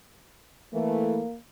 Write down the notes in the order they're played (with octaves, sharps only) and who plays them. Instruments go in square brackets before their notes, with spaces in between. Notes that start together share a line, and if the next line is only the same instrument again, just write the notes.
[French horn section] E3 A3 [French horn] A#3